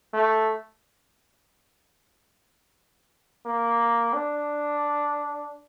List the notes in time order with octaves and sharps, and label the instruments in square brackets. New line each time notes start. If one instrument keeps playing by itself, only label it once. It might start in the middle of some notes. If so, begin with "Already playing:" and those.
[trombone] A3
A#3
D4